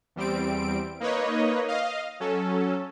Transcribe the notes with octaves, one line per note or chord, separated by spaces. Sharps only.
E2 G3 C4 D7
A#3 D#4 B4 C#5 D#5
D#5 F5
F#3 C#4 A4